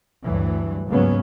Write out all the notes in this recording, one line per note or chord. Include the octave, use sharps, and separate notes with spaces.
D2 G2 E3 F#3
D#2 G#2 C#3 F#3 B3 C#4